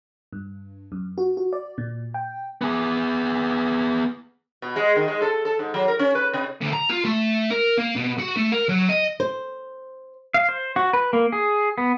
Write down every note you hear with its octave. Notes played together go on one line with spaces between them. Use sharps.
G2
F#2
F#4
F#4
D5
A#2
G5
B3 G#4
B2
G#3
D#3
G#3
A4
A4
G#2
F#3
A#4
C#4
B4
C3
D2
A#5
F4
A3
A#4
A#3
B2
F#4
A3
A#4
F#3
D#5
C5
F5
C5
F#4
B4
A#3
G#4
B3